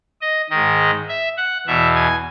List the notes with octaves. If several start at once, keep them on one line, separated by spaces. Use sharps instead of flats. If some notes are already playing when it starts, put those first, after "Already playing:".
D#5
G#2 D#3 D#5
E5
F#5
E2 B2 E5
G#5